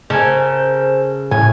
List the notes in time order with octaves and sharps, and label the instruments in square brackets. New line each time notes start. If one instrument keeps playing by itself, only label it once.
[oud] C#3 [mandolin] A4 A#4 G#5 [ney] C5
[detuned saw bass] A2 [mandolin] G#5